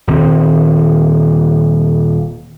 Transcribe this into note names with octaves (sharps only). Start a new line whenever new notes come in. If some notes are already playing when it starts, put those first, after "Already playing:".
D#1 D#3 C4